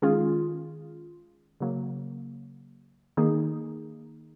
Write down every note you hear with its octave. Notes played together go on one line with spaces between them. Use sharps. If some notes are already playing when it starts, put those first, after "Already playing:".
D#3 G#3 C#4 F4 G#4
C#3 F#3 A#3
D#3 A#3 D#4 G#4